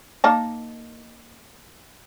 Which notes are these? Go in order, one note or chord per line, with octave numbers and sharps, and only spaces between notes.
A#3 D#4 A5